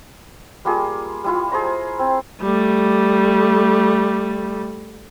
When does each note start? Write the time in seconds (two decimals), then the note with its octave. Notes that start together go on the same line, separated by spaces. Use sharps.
0.65 G3 A#3 F4 G#4
1.24 G3 E4 F4
1.52 G#4 C5 A#5
1.99 C4
2.42 G3 A3